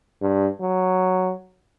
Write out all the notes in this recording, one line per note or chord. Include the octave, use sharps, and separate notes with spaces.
G2
F#3